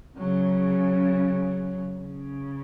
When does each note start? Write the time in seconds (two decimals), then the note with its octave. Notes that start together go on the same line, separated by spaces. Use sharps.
0.17 C#3 F#3
1.97 C#3